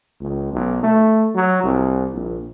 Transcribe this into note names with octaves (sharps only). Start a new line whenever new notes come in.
C#2
B1
A3
F#3
C2
A#1